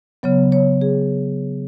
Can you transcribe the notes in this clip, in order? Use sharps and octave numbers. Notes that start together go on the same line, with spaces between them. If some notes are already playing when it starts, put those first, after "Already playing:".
C#3 F#3 B3 C#5
C#5
G#4